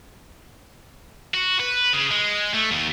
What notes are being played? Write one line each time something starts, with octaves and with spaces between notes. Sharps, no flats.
F#4
B4
C#3
G#3
A3
D#2